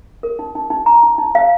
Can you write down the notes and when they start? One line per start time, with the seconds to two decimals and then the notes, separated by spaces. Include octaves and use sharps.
0.23 A#4
0.39 D#4
0.55 D#4
0.70 D#4
0.86 A#5
1.03 D#4
1.18 D#4
1.35 F5